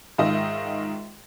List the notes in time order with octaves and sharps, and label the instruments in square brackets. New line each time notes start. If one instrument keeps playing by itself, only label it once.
[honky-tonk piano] G#2 D#3 F4 D#5 E5